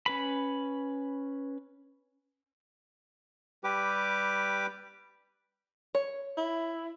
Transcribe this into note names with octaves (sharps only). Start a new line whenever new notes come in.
C#4 B4 B5
G3 G4 B4 D6
C#5
E4